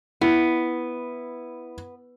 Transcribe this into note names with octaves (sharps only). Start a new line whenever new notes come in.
B3 E4